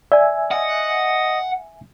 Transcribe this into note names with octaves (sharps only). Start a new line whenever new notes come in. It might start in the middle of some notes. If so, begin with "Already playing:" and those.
D5 E5 G#5
D#5 F#5